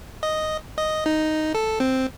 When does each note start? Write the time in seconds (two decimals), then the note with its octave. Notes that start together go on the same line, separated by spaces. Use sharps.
0.23 D#5
0.78 D#5
1.06 D#4
1.54 A4
1.80 C4